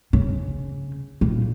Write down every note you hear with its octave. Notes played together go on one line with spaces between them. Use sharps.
C#3
A#2